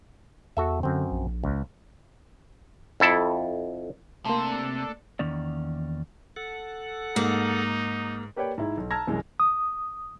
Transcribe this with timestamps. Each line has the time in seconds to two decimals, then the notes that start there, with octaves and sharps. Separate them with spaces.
0.57 E2 F#4 A4 E5
0.83 F#2 D3 C4
1.11 A#1
1.44 C#2
3.00 F2 E4 A4 A5
4.25 C3 A3 A#3 D4 A4 A5 C6
5.19 E2 D#3 A#3 C#4 D5
6.36 A4 F#5
7.16 G#2 A#3 D#4
8.36 A#3 G4 B4 C#5 D5 G5
8.58 G#2 E4
8.77 B1
8.91 A5 A#5 E6 F6 G#6 A#6
9.07 C2 F#2 E3 G#3
9.40 D#6